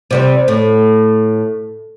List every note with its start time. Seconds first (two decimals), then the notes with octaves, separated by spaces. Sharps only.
0.11 C3 G3 C4
0.48 A2